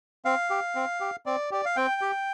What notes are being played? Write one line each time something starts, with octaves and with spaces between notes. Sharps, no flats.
C4 F5
G4
C4
G4
C4 D5
G4 D5
F5
C4 G5
G4